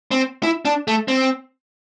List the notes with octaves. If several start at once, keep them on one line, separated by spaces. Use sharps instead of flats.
C4
E4
D4
A3
C4